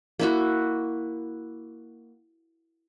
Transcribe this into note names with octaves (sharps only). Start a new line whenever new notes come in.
A#3 E4 F#4